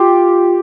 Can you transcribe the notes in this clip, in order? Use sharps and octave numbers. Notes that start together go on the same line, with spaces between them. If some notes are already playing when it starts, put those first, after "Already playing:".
Already playing: F4 G4